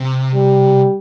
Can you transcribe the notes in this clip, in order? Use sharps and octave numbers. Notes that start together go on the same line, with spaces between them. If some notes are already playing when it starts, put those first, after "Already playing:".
Already playing: C3
G3